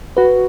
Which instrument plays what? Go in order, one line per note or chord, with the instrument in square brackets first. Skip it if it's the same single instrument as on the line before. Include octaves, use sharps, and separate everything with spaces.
[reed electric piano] F#4 [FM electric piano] B4